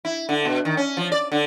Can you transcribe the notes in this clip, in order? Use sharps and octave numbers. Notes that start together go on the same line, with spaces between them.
E4
D3
B2
D#3
C#4
F3
D5
D3